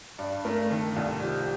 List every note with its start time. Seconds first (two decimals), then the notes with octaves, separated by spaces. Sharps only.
0.19 G2 D5
0.45 A3 A#4
0.71 D#3 A4
0.96 C2 F4
1.22 F3 G4